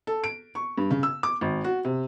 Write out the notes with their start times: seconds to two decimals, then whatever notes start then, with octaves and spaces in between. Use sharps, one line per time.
0.07 A4
0.24 D7
0.55 C#6
0.78 G2
0.91 C#3
1.03 E6
1.23 D6
1.41 G#1
1.64 F#4
1.85 C3